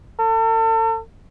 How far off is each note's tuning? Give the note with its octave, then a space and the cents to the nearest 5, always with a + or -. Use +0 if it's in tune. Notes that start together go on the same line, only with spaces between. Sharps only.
A4 +35